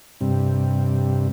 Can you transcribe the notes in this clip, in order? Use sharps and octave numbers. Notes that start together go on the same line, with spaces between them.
G2 C3